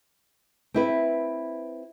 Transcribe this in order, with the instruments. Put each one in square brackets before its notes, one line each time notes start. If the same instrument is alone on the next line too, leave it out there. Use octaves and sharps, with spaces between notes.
[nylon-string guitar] C4 E4 B4